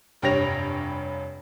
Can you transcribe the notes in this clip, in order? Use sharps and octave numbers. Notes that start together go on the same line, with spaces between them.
F1 G2 G4 C#5 A#6 F7